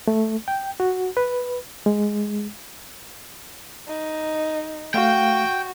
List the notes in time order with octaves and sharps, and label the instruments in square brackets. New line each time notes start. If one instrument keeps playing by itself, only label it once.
[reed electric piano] A3
G5
F#4
B4
G#3
[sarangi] D#4
[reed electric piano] A3 F5 [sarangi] F#4 [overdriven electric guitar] G5